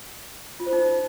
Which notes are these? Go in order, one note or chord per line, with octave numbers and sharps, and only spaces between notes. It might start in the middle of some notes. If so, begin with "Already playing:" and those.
F4
C5
D#4